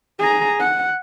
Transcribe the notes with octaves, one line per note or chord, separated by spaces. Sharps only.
G#4 A#5
F#5